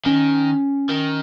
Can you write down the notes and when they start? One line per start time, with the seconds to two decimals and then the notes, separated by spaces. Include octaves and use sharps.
0.05 D#3 C#4
0.90 D#3